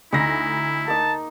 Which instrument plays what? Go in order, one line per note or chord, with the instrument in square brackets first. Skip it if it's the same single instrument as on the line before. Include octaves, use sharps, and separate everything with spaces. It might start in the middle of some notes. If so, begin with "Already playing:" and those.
[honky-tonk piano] D2 A#6 [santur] D#4 [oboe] E4
[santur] A#3 D#4 [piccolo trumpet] A5